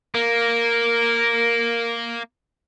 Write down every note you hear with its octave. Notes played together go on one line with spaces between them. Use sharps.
A#3 A#4